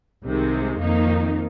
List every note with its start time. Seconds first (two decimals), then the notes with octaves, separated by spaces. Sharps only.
0.23 C2 C3 D#3 G#3
0.79 F2 D#3 A#3 D#4